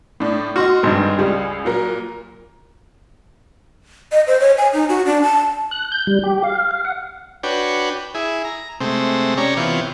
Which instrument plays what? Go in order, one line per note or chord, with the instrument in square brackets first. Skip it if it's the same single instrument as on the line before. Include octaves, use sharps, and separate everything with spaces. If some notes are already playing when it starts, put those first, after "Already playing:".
[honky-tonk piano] A2 D4
[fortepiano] F#4 [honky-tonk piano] D#5 C6 F6
[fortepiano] G#1 G2
[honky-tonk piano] C#2 G#4 [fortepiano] G3
[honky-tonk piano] A#2 F#3 A#4
[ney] D#5
C5
C#5
G#5
D#4
F#4
D4
A5
[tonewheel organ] F#6
G6
G3
G4
F5
F5
F5
F#5
[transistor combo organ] D4 F#4 B4 C#5 G5
E4 G#4
A#5
C3 G#3 A3 C4
C#4 G4 C#5 D5 A#5
C3 E3 B3 F4 C#5 G5